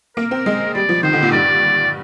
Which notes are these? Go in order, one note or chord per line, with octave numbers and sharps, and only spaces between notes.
A#3 A#4
C4
G#3
G3 D5
F3
D#3 C5
D3
A#2
G2 D5